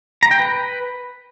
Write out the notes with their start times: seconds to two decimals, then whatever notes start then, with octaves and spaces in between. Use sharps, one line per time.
0.23 A#5
0.31 G5
0.40 B4